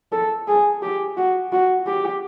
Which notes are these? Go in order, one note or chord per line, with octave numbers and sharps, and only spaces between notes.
A4
G#4
G4
F#4
F#4
G4